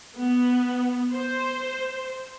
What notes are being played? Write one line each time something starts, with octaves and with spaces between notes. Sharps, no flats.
B3
C5